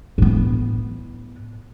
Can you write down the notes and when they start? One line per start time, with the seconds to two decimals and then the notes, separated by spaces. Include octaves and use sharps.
0.18 A2 B3